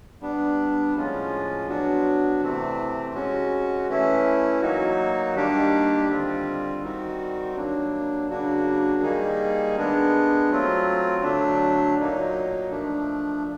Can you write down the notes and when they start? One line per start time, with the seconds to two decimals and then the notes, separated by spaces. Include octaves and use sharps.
0.20 G3 B3 D4
0.94 A2 F3 G#3 C#4 F4
1.67 F#3 B3 D4 F#4
2.42 C3 E3 A3 C4
3.14 G#3 C#4 F#4
3.89 E3 A3 C#4 E4
4.62 F#3 A#3 D#4 F#4
5.35 D#3 G3 A#3 D4 G4
6.09 D3 G3 C4 F4
6.81 D#3 G3 C4 D#4 F#4
7.55 F#3 A#3 D4
8.30 C#3 F#3 A#3 D4 F#4
9.02 D#3 G3 A#3 D#4 G#4
9.76 G#3 B3 D4
10.49 F#3 A3 C4 F4
11.22 D3 F#3 A3 D4
11.97 A#2 F#3 A#3 D#4
12.70 F3 A3 D4